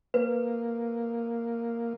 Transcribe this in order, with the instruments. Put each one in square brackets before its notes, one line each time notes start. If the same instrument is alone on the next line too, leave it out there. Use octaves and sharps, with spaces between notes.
[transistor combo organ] A#3 [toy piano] B4